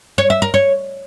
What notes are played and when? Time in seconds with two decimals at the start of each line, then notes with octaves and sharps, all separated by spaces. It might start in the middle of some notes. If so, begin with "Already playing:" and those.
0.18 C#5
0.30 E5
0.42 A#4
0.54 C#5